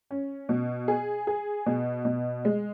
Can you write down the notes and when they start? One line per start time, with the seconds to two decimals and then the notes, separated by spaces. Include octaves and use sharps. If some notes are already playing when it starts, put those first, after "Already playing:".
0.11 C#4
0.49 B2
0.88 G#4
1.27 G#4
1.66 B2
2.05 B2
2.45 G#3